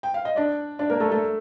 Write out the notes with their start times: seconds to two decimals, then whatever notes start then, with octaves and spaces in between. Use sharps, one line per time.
0.03 G5
0.14 F5
0.25 D#5
0.36 D4 D5
0.79 D4 D5
0.90 A#3 A#4
1.00 A3 A4
1.11 A3 A4